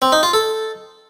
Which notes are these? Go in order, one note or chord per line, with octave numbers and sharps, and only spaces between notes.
C4
D#4
F4
A4